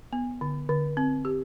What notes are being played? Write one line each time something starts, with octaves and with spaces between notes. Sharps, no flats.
B3
D3
D3
C4
G4